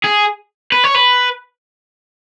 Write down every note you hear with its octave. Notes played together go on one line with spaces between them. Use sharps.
G#4
B4
C#5
B4